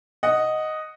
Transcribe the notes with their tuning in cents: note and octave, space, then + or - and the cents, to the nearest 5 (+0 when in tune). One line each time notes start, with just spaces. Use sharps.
D#5 +0 F#5 +0